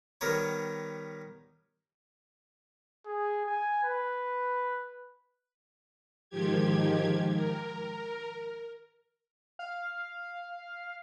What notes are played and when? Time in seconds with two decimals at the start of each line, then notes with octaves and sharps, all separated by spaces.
0.21 D#3 G3 B3 A#4 B4 C#5
3.06 G#4
3.46 G#5
3.84 B4
6.30 G#2 D#3 F3 G4 G#6
7.34 A#4
9.59 F5